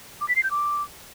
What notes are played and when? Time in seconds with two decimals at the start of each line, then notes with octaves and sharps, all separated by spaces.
0.21 D6
0.28 B6
0.36 C7
0.43 G6
0.51 D6